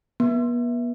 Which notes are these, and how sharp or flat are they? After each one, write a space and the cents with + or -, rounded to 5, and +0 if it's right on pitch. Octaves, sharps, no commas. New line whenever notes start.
B3 -40